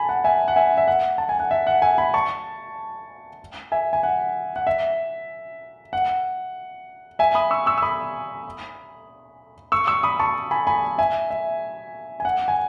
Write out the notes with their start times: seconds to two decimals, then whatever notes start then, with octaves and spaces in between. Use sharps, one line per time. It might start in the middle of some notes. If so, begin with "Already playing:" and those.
Already playing: G#5 A5 B5
0.09 F#5
0.24 E5 G#5
0.48 F#5
0.56 E5 G#5
0.78 E5
0.87 F#5
1.18 A5
1.29 G#5
1.40 F#5
1.51 E5
1.67 F#5
1.82 E5 G#5
1.98 G#5 B5
2.14 A5 C#6
3.72 E5 G#5
3.93 G#5
4.03 F#5
4.56 F#5
4.67 E5
5.93 F#5
7.19 E5 G#5
7.35 B5 D#6
7.51 C#6 E6
7.66 C#6 E6
7.78 E6
7.82 B5 D#6
9.72 C#6 E6
9.87 C#6 E6
10.03 B5 D#6
10.19 A5 C#6
10.51 G#5 B5
10.67 G#5 B5
10.98 E5 G#5
11.31 E5
12.20 G#5
12.25 F#5
12.48 G#5